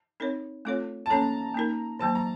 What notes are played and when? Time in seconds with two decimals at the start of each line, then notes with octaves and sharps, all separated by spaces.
0.20 C4 D#4 A#4 C#5
0.65 A3 C4 F4 A4 C#5
1.06 A5
1.10 A#3 C#4 A4 C#5 A#5
1.54 A#3 D#4 A#4
1.99 D#3 F#3 A#3 A5
2.15 A#5